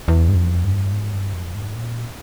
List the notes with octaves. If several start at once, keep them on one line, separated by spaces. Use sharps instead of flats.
E2
G2
F2
G2
G#2
G2
F2
G#2
A#2